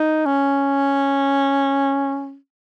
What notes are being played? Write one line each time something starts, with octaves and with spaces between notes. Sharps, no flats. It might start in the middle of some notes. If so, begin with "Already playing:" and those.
Already playing: D#4
C#4